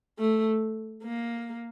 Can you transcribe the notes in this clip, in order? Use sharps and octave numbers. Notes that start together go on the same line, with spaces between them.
A3
A#3